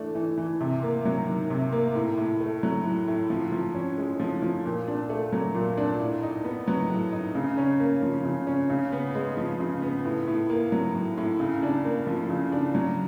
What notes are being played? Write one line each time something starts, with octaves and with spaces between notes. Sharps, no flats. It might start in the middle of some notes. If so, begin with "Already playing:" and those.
Already playing: E3 A3 D4
E3
E3
C3
A#3
F#3
D#3
C3
A#3
A2
A2
A3
F#3
A2
A2
F3
F3
C#4
G#3
F3
F3
A#2
D4
A3
F#3
A#2
D4
A2
D#4
B3
F#3
A2
D#4
C#3
C#4
A#3
F3
C#3
C#4
C#3
B3
G#3
F3
C#3
B3
A2
A2
A#3
F#3
A2
A2
C#3
D4
A#3
F3
C#3
D4
F#3